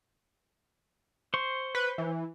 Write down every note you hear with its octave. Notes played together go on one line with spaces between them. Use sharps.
C5 C6 C#6
B4
E3